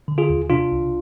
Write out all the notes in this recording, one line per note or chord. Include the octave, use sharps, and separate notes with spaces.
D3
F4 G#4
D#2
C3 D4 F4
C2